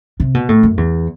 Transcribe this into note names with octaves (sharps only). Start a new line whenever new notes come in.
C3
B2
A2
F#2
E2